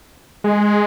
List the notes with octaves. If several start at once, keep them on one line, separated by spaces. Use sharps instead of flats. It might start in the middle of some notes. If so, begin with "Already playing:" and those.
G#3